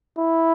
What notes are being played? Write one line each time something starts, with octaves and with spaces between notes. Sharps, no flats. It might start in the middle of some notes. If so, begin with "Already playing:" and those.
E4